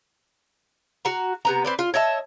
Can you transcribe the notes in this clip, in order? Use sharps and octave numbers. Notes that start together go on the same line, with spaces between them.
F#4 F#5 A#5
C3 B3 A#5
C4 B4 D5
F4
C#5 D#5 E5 A5